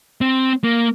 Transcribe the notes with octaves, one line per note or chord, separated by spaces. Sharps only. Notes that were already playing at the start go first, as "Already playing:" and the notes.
C4
A#3